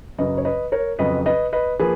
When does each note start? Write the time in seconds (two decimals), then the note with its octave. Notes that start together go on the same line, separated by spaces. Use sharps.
0.18 F#2 C#3 F#3 B4 D#5
0.38 C#5
0.45 B4 D#5
0.72 A#4 C#5
0.99 F2 C#3 F#3 B4 D#5
1.26 B4 D#5
1.53 B4 D#5
1.80 F3 A#3 G#4 B4